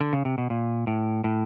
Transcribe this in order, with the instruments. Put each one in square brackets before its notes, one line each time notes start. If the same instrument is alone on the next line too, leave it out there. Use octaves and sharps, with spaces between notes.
[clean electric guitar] D3
C#3
C3
B2
A#2
A2
A2